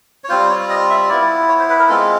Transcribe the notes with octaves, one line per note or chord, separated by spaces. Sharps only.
C#5
G3 C4 F4 C5
C#5
D#5
E5
B3 E4 D5
C#5
C5
B4
A#4
G#3 C4 F4 A4